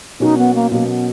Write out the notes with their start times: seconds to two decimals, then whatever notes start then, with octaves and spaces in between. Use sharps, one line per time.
0.20 B2 F#3 C#4 D#4 F#4 A#4
0.38 B3
0.55 A#3
0.71 B2 F#3 A#3 C#4 F#4 A#4
0.88 B3